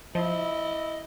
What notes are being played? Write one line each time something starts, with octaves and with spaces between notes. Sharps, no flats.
F3 E4 D#5